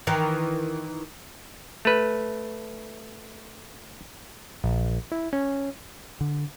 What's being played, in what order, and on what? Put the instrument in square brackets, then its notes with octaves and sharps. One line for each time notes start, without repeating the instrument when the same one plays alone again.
[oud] D#3 E3
[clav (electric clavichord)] A3 B4
[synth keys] A#1
E4
C#4
[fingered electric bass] D3